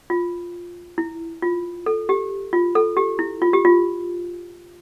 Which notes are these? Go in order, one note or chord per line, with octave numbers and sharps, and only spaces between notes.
F4
E4
F4
A4
G4
F4
A4
G4
E4
F4
G4
F4